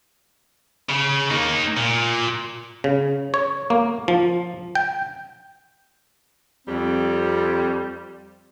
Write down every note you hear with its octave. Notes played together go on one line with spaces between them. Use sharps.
C#3
A#3 D#4
A#2
C#3
C#5
A#3
F3
G5
F2 G3 C4